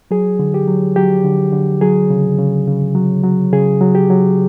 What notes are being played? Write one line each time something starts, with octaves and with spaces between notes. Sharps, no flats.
F#3 G#4
D3
G4
F#3
F#3 G4
D3
D3
F#3 G#4
C#3
C#3
C#3
F#3
F#3
C#3 G#4
F#3
G4
F#3